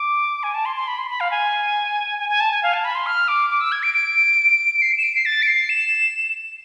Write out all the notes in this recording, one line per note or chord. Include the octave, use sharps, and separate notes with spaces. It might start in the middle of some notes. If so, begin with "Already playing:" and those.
Already playing: D6
G#5
A5
C6
C6
B5
C6
B5
F5
G#5
G#5
G#5
A5
G#5
F5
A5
B5
C6
F6
D6
D6
E6
G#6
D7
D7
C7
D7
E7
D7
C7
A6
D7
C7
E7